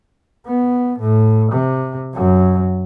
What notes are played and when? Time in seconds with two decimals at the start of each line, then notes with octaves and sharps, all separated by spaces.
0.46 B3
1.00 A2
1.52 C3
2.14 F#2 F#3